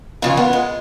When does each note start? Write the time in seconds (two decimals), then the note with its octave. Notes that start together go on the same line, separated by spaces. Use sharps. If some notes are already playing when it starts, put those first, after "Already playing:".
0.22 F2 C#3 E3 F4
0.37 B3
0.53 G#3